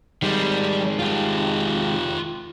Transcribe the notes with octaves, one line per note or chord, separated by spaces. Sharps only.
D#3 G3 G#3
F4 G4